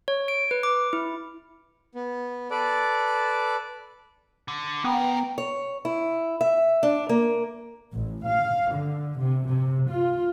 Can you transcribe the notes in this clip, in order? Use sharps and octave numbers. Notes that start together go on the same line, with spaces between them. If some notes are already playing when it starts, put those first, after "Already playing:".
C#5
D7
B4
D6
E4
B3
A4 B4 D5
D3
C#3 B3 A#4 G5
C#5
E4
E5
D4
A#3
A1
F5
D3
C3
C3
F4